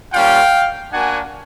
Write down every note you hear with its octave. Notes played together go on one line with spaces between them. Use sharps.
G3 A#3 C#4 F4 F5 G5
A#3 D4 F#4 F#5 G#5